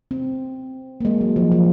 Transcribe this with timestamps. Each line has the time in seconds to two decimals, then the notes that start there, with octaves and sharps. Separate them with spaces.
0.11 C4
1.01 A#3
1.05 G#3
1.21 F#3
1.36 F3
1.52 F3